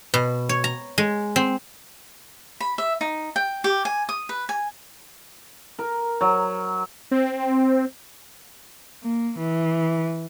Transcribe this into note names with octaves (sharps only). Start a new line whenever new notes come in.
B2
C#5
A#5
G#3
C4
B5
E5
D#4
G5
G4
G#5
D#6
B4
G#5
A#4
F#3
C4
A#3
E3